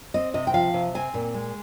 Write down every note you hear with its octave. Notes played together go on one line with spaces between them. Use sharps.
C4 D#5
C3 D#5
G5
F3 F5
C3
C4 G#5
A#2
G#3